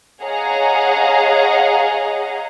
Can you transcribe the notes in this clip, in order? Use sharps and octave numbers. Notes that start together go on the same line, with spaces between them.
G#4 C#5 D#5 F5 F#5 A#5